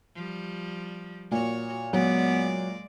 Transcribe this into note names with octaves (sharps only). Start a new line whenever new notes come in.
F3 G3
A#2 F#4 C#5
F#3 G#3 B3 D5